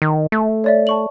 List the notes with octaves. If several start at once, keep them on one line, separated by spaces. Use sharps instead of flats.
D#3
A3
C#5 D5 E5
A5 C#6 F#7